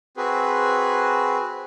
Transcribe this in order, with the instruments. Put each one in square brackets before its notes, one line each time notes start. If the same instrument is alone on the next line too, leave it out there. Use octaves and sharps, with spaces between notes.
[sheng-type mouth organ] C4 F#4 G#4 B4